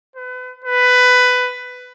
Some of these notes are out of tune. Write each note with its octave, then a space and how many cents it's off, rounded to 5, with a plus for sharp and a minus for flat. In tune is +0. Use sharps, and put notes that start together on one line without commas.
B4 +35
B4 +15